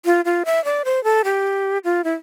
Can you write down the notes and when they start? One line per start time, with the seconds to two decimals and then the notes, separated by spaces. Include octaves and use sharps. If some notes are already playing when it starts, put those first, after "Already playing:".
0.05 F4
0.25 F4
0.45 E5
0.65 D5
0.85 C5
1.04 A4
1.24 G4
1.84 F4
2.04 E4